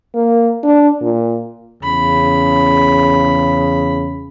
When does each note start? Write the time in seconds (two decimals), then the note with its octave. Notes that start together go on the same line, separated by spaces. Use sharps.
0.15 A#3
0.64 D4
1.02 A#2
1.83 E2 C#3 B5